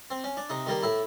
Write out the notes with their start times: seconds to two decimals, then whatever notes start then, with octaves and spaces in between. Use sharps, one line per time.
0.10 C4
0.24 C#4
0.37 D4
0.50 C3 D#4
0.66 D#3 G3 A#3
0.83 A2 E4